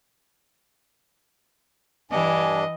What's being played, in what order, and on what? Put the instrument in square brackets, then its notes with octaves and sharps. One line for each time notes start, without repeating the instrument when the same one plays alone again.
[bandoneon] G2 D4 [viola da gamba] E3 [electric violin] D#5 [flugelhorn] G#5